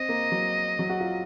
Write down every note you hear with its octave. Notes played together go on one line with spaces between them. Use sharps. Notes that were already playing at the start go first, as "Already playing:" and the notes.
Already playing: C4 D#5
A#3
F#3
F#3
F#4
F4